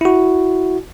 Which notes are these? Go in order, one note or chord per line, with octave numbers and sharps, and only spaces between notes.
E4 F#4